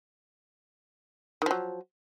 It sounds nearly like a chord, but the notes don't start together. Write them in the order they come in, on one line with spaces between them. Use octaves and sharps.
D#3 F3 F#3